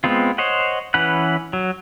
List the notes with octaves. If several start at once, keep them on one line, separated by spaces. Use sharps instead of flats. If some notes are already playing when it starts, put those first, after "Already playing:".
G#3 B3 C4 F4
C5 C#5 D#5 F#5
E3 C#4 B4 F#5 F#6
F#3